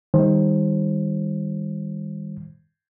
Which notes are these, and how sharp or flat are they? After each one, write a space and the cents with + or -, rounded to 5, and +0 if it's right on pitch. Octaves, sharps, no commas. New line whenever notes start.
D#3 +15 G3 +30 C5 +25